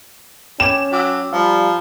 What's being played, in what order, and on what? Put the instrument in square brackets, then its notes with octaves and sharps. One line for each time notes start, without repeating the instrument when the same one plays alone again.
[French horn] C#4 [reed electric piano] G5 D6 G#6 [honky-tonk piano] E7
[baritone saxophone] F#3 [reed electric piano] G5 D6 E6
[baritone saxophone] F3 [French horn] G3 [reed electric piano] F5 A#5 B5